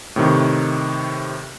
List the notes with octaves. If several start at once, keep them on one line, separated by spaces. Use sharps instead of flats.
A2 C3 D#3